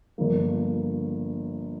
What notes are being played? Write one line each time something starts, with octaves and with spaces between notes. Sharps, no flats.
G1 G2 F3 A#3